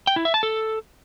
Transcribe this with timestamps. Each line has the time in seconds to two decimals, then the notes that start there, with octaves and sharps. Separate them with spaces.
0.07 G5
0.16 E4
0.25 E5
0.34 A5
0.43 A4